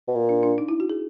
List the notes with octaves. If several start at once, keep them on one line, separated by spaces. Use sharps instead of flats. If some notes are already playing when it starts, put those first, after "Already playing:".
B2
A#2
D4
D4
D#4
E4
F#4
G#4